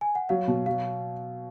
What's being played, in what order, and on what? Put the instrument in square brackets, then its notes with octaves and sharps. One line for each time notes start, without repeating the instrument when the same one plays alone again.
[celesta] G#5
F#5
[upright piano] F#3 [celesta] F5
[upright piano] B2
[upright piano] F#3 [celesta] F5